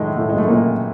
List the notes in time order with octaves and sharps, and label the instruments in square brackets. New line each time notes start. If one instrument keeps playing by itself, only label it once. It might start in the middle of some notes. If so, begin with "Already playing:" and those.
Already playing: [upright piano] F#2 A2 D#3 G#3 A3
A2 A3
F#2 G#3
A3
A#2 A#3